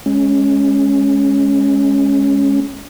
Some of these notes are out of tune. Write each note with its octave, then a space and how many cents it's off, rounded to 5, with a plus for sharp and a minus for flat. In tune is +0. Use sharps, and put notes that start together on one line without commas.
G#3 +10 C#4 +0